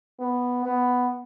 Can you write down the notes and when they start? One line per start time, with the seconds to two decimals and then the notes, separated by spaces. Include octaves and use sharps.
0.20 B3
0.65 B3